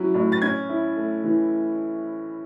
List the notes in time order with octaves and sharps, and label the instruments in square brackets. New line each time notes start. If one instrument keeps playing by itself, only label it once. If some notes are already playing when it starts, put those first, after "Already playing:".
Already playing: [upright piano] F#3 C#4 E4
A2
A6
C#4 G#6
E4
A3
E3